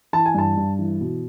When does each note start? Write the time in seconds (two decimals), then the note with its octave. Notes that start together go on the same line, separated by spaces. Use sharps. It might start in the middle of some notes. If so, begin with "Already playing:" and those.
0.13 E3 A5
0.26 G#5
0.34 G2 A5
0.57 G2
0.79 E3
1.00 B2